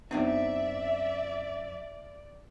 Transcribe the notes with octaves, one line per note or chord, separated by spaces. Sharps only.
F#2 B3 C4 D4 D#4 D5 E5